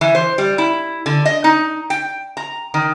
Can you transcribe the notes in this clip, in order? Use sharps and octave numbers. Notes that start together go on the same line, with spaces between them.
E3
C5
G3
E4
D3
D#5
D#4
G5
A#5
D#3